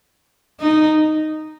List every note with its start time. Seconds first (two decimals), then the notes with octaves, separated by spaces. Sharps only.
0.60 D#4